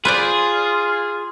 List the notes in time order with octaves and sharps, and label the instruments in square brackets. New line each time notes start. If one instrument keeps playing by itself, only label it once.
[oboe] F4 [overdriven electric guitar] G#4 [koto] B4 C5 D5 [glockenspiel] C6